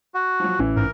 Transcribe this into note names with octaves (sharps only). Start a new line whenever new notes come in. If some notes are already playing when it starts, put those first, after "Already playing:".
F#4
F3 F#3
A1 E3 C#4
G#2 A#4